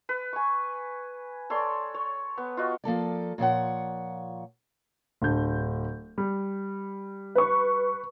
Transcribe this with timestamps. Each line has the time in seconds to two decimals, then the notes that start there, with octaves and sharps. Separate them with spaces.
0.09 B4
0.33 G#5 C#6
1.50 A4 C#5 D5 C6
1.94 C#5
2.38 B3
2.57 F4 F#4 D#5
2.84 F3 A#3 A4 D5
3.38 A#2 F3 C#5 F#5
5.22 D1 D4 G6
6.18 G3
7.35 B4 C#6